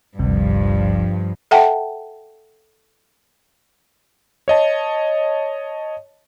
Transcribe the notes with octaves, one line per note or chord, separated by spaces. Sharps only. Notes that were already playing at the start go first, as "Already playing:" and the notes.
G#1 D2 G2 C3 F3
A4 E5 F#5 G5 A5
C#5 D#5 A5